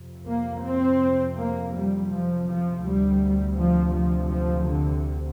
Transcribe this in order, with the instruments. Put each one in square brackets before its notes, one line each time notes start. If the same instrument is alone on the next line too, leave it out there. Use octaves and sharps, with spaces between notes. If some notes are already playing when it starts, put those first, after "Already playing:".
Already playing: [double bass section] F2 C3
A#3
C4
A#3
G3
F3
F3
D2 C3 G3
F3
F3
F3
D3